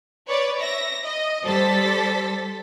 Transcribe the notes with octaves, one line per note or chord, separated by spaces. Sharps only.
B4 C#5 D5
E5 A#6
D#5
G3 A4 C5 A6 B6